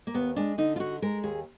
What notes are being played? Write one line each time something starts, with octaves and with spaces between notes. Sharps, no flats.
A#3
D#2 B3
G#3 D4
D3 D#4
F4
D3 F#4
G#3 A#4
D#2 G#4